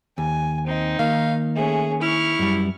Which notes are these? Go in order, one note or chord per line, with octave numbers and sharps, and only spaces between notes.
D#2 G#5
C4 D#4
D#3 A#3 F5
A3 C#4 G#4
E4 C#6 F6
F#2 G3